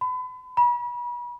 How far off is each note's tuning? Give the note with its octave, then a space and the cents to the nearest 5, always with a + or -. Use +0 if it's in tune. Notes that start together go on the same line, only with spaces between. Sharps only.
B5 +35
B5 -35